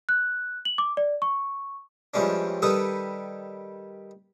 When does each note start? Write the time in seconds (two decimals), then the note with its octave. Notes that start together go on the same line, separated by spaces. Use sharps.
0.09 F#6
0.65 F#7
0.78 D6
0.97 D5
1.22 C#6
2.14 F2 E3 G3 G#3 C#4 D4
2.62 D#3 G3 A4 B4 B5 D#6